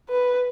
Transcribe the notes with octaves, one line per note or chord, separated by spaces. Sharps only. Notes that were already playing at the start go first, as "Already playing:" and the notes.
B4